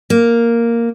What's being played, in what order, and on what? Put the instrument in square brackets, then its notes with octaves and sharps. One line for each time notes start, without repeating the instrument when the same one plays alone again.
[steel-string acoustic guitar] A#3